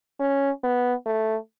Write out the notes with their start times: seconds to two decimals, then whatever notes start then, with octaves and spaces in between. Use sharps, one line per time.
0.20 C#4
0.64 B3
1.06 A3